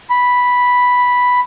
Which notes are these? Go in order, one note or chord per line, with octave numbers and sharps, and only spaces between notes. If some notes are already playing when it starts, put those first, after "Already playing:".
B5